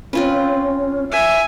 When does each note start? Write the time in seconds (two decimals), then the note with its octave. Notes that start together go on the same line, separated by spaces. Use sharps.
0.13 C4 C#4 F4 B4
1.11 E5 G#5